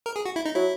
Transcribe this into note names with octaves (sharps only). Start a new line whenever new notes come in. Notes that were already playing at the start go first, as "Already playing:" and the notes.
A#4
G#4
F#4
E4
D#4
F#3 E4